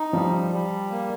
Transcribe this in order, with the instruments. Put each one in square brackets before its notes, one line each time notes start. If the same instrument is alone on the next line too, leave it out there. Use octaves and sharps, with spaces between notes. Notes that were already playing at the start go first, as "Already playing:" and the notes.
Already playing: [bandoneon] D#4
[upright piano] F3 [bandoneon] G3
[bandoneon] G3
A#3